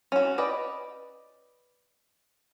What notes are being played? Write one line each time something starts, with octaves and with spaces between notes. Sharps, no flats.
C#4 F#4
B4 D5 D#5 G5